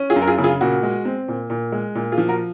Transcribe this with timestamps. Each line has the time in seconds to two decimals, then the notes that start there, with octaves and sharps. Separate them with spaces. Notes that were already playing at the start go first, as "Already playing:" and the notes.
Already playing: C#4
0.10 F4 G#4
0.16 F#2
0.22 A#4
0.27 F4 G#4
0.38 C#3
0.44 F4 G#4
0.61 A#2 F#4
0.83 G#3
1.05 C4
1.28 A#2
1.50 A#2
1.72 G#3
1.95 A#2
2.12 F4 G#4
2.18 F3
2.29 F#4 A#4